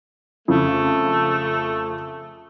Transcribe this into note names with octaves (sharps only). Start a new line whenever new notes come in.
F2 C#3 A3